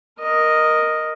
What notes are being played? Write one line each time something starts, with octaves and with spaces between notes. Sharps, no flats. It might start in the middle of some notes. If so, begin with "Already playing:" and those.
A#4 D#5